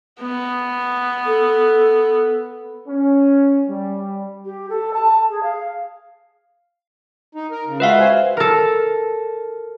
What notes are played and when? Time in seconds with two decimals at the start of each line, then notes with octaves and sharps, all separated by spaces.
0.21 B3
1.26 A4
2.88 C#4
3.69 G3
4.44 G4
4.69 A4
4.93 A5
5.29 G#4
5.43 F5
7.35 D#4
7.51 A#4
7.67 C#3
7.80 G#3 F4 F#4 B4 E5 F5
8.00 C5 G#5
8.37 A4 A#4